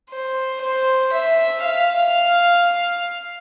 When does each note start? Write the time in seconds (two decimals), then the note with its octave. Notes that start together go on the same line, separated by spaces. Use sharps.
0.11 C5
0.61 C5
1.12 E5
1.63 F5